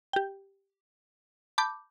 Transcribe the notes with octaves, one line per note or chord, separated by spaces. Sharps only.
G4 G5
A5 B5 D6 G6